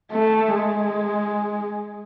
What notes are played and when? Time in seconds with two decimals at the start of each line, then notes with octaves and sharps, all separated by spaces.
0.11 A3
0.54 G#3